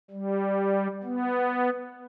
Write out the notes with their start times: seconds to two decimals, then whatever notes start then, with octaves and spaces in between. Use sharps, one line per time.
0.11 G3
1.03 B3